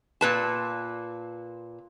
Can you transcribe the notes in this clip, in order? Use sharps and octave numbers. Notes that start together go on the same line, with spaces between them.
A#2 B4 A5